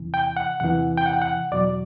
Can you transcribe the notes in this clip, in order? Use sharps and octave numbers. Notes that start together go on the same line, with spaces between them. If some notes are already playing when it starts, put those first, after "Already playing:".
Already playing: E2 C3 E3
G5
F#5
E2 C3 E3 F#5
G5
F#5
G5
F#5
E2 B2 F#3 D5